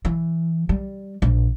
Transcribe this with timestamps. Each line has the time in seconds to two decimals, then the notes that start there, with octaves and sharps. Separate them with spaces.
0.05 E3
0.69 G3
1.22 A#1